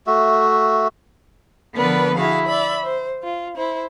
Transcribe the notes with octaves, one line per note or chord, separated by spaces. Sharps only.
A3 F#4 E5
D3 F3 B3 A#4 B4 D5
E4 F#4 G#4 F5
D5 E5 B5
C5
F4
E4 C5